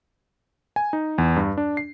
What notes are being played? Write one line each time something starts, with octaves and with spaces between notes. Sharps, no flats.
G#5
D#4
E2
G2
D4
C7